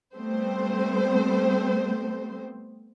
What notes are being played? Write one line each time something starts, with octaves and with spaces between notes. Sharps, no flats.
G3 A3 B3 C4 C5